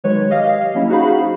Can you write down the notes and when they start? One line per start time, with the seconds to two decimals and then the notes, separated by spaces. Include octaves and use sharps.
0.04 D#3 F#3 G#3 B4 C#5
0.30 G4 D#5 F5
0.74 F#3 A#3 C#4 E4
0.89 D#4 F#4 G#4 C5 F5 B5